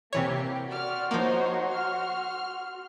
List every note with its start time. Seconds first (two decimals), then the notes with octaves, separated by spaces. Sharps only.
0.13 C3 E3 A#3 G4 C#5
0.68 F#4 D5 C6 F6
1.11 F3 A#3 D#4 C5 C#5
1.70 F6